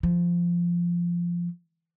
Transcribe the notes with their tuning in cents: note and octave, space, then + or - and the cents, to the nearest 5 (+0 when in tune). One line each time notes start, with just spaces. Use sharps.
F3 -10